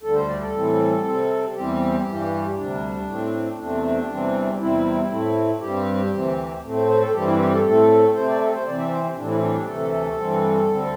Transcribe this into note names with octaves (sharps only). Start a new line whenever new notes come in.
D2 D3 G3 A4
C5
D5
A4
A2 E3 G3 C4
C3 G3 C4
E2 E3 G3 C4 G4
G2 E3 G3
D2 C3 G3 D4
A2 A3 C4
E2 C3 A3 C4 D4
E2 C3 E3 G3 C4
E2 C3 G3 C4 E4
A2 A3 C4
G2 G3 C4 G4
D2 C3 E3 C4
A2 A3 C4
C5
C5
A4
G2 E3 G3 C4 G4
E4
G4
A4
A2 A3 C4 A4
C3 A3 C4 C5
D5
A4
C5
C3 E3 C4 D5
E5
C5
C4
A2 E3 G3 C4 D4
E4
D4
D2 C3 E3 A3 A4
G2 E3 G3 C4
D2 D3 G3 C4